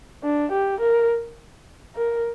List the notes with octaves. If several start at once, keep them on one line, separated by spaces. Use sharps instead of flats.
D4
G4
A#4
A#4